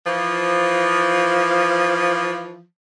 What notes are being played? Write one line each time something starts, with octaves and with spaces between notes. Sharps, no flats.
E3 F3